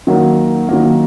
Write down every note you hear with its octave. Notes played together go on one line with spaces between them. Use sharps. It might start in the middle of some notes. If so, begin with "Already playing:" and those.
D#3 F#3 A#3
D#3 F#3 A#3